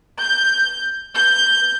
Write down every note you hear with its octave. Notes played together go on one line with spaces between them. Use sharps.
G6
G6